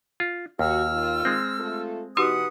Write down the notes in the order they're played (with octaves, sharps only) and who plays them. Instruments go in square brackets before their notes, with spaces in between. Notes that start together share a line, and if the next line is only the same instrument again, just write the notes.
[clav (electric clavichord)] F4
[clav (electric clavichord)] D#2 [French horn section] F#4 [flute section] E6 F6
[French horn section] D#3 F4
[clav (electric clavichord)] G#3 C4
[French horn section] A3 F4 A4
[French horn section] B2 E3 [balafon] D#4 F#4 G4 [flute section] B4 F#5 D#6